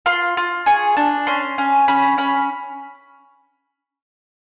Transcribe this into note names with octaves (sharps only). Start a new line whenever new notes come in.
F4 C6
F4
G#4 C#6
D4
C#4 C6
C#4
C#4 B5
C#4 B5